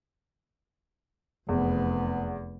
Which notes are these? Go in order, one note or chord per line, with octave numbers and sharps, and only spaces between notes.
F1 E2 B3